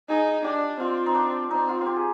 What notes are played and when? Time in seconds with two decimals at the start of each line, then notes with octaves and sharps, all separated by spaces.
0.09 D#4 G#4
0.44 D4 G4
0.80 C4 F4
1.06 D#4
1.15 D4
1.51 C4 D#4
1.69 F4
1.86 G4
1.96 G#4